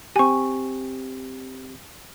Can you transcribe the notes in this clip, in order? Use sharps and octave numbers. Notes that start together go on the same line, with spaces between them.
C4 G4 G#5 C#6